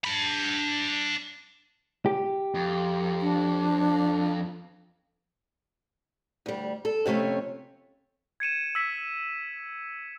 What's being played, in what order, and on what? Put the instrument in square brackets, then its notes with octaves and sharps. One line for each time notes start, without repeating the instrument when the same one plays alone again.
[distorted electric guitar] D4 B5
[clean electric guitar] G4
[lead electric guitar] F2
[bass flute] D4
[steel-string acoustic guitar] D2 G3
A4
F2 C3 A3 C#4 C#5
[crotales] G#6 C#7 D#7 E7
E6 B6